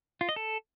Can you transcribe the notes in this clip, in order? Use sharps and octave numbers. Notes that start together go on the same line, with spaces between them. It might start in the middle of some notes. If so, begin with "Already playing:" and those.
F4
D#5
A4